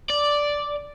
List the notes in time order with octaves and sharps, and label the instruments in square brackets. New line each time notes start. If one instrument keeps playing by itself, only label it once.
[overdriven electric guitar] D5